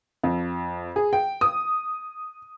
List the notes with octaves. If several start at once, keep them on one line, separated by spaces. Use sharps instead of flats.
F2
G#4
G5
D#6